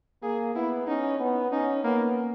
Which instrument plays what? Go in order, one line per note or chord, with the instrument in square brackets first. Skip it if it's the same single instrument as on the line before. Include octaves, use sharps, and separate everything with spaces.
[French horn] A#3 [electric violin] G#4
[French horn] B3 [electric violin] E4
[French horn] C#4 [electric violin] D#4
[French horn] B3
[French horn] C#4 [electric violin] D#4
[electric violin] A#3 [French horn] B3